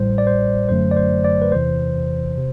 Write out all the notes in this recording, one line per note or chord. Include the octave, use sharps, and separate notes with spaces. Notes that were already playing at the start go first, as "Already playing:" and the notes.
Already playing: A1 A2 G3 C5
D5
C5
G1 F#2 D3 F#3 A3 C5
D5
C5
D5
B4
E2 C3 E3 C5
C3